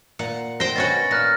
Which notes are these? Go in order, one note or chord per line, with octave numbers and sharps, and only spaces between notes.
A#2 F#5
C5 G5 A#6
B2 C#4 F#4 A6
A#2 F6 F#6 A#6